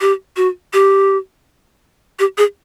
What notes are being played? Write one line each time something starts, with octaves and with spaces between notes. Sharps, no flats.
G4
F#4
G4
G4
G#4